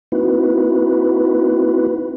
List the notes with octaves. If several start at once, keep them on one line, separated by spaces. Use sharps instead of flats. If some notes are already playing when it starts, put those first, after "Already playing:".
A#3 C4 D#4 E4 F#4 B4